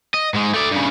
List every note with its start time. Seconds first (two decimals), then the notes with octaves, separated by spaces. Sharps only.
0.14 D#5
0.34 G#2 G#3
0.54 A3 D5
0.71 G2 C#3